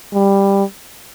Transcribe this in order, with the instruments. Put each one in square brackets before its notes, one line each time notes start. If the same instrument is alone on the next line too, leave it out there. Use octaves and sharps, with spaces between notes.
[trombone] G3